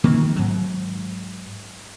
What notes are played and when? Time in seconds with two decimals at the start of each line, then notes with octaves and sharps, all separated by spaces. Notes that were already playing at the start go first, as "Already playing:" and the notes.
0.04 D#3 A#3 C4
0.36 G#2 F#3